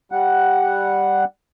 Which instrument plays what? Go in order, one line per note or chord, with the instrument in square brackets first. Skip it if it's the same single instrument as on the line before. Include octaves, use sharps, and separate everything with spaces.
[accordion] G3 F#5